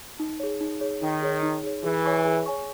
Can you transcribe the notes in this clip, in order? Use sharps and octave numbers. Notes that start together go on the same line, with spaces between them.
D#4
G#4 C#5
D#4
G#4 C#5
D#3 D#4
G#4 C#5
D#4
G#4 C#5
E3 G#4
C#5 G#5 C#6
G#4
C#5 G#5 C#6